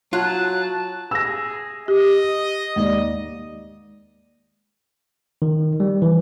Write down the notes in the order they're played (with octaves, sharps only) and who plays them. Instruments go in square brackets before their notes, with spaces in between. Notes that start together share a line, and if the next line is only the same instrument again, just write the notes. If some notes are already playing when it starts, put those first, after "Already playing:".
[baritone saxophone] F#3 [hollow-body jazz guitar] F4 [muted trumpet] A5 [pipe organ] F#6
[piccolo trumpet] G#4 [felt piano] E6 A#6
[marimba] G4 [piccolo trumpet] D#5
[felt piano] D#2 D5 [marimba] G#3
[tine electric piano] D#3
G3
E3